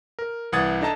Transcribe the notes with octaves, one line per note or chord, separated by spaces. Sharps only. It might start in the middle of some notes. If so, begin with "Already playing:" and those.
A#4
C2 E3 F#5 D#6 G#6 A6
D4 D#4 A4 D#5 A5 A#5